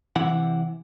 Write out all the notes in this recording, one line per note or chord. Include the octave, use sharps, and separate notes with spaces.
C3 E3 E4 F#5